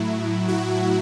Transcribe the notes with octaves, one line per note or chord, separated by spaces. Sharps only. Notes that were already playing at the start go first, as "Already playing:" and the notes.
Already playing: A2 F#3 E4
F#4